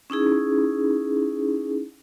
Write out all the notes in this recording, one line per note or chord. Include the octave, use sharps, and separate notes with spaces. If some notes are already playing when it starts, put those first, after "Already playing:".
C#4 D#4 E4 G#4